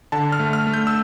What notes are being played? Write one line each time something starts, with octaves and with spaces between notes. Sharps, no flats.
D3 A5
F6
A3
F6
A3
G6
E6